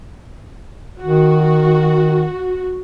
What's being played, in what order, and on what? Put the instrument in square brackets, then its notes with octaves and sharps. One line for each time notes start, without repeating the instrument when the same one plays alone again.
[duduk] D#3 [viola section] F#4